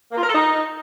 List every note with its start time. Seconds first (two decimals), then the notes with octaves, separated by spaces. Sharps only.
0.12 A#3
0.18 F4
0.23 A#4
0.29 A4
0.35 D#4